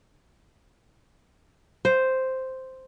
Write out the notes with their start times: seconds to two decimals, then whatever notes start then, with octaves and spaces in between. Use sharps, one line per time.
1.85 C5